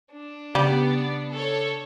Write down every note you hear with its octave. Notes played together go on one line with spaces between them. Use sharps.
D4
C#3 G3 B3 D5
A4 C#5